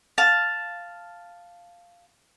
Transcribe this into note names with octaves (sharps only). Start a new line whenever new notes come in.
F5 A5